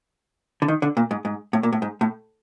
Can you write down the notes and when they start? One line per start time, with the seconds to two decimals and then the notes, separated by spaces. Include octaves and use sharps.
0.62 D3
0.68 D#3
0.82 D3
0.97 A#2
1.11 G#2
1.25 G#2
1.53 A2
1.63 A#2
1.73 A2
1.82 G#2
2.01 A2